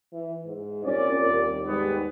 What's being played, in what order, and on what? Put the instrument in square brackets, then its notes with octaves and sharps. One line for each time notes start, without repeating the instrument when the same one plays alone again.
[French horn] E3
G#2
[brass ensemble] C2 A#2 D5 [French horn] C#4
[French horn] D#2
[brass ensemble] G#2 G3 B3